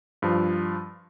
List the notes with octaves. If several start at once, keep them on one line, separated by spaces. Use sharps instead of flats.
G2 F3